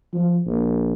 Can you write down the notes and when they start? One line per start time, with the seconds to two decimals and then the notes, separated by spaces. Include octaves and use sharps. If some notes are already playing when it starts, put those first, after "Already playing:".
0.14 F3
0.47 A#1